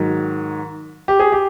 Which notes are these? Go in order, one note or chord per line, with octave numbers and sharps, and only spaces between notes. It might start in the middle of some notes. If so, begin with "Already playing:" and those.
Already playing: G#2 D#3 F#3
G4
G#4
G4